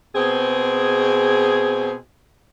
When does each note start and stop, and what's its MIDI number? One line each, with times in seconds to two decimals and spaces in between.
0.14 1.93 47
0.14 1.93 60
0.14 1.93 68